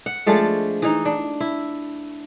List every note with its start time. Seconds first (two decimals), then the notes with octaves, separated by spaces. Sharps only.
0.06 F#5
0.26 F3 G#3 A3 D4
0.82 E3 D#4
1.05 D4
1.40 E4